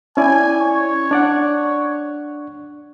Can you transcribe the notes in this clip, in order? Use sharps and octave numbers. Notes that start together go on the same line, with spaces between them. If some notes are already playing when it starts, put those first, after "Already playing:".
C#4 E4 D5 G#5
C#5
D4 D5 F#5